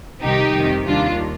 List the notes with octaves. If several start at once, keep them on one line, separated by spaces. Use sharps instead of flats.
C2 C3 D#3 G3 D#4 G4
F2 C3 D#3 G3
D#2 D#3 G3 D4 F4